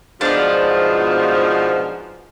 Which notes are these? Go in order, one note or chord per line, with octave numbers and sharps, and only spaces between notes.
G#2 B2 F3 D4 F6